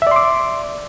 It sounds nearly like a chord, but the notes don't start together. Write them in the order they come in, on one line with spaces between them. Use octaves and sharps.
E5 D5 C6 D6